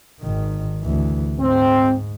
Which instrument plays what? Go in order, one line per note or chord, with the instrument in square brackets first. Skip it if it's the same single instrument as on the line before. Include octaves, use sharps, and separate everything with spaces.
[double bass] G#1 D#3
D2 E3
[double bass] G#2 [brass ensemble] C4